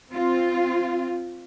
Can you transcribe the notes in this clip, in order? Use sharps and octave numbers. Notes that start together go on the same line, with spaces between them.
C4 F4